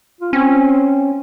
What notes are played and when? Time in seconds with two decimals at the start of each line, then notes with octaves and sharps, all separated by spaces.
0.21 F4
0.33 C4 C#4